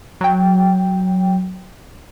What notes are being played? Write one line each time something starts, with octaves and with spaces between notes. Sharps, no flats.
F#3 G5